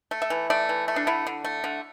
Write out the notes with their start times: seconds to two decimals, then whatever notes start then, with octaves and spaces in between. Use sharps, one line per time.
0.11 A3
0.22 E5
0.30 E3
0.50 A3 D5
0.69 E3
0.88 A3
0.96 D4
1.07 D3 E4
1.27 D3
1.44 A3
1.64 D3